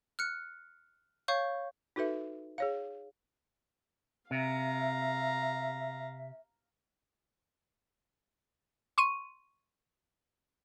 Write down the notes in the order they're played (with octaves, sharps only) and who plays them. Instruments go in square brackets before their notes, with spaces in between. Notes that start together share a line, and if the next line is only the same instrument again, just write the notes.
[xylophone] F6 F#6 C#7
C#5 F5 C#6 G6
[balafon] D#4 F#4 A4 B4 E5
G#4 C#5 F5
[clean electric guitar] C3 [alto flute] E5 [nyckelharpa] F5 A#5
[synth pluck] C6 C#6 D#7